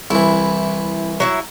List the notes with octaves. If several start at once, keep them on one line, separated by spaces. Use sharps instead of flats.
C2 E3 E4
F#3 E4 E5